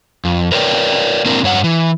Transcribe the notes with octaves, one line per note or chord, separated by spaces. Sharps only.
F2
A#4 B4 C#5 D5 F#5 G5
A#3 C4 D4 E4 A#4
G2 C#5 F#5
E3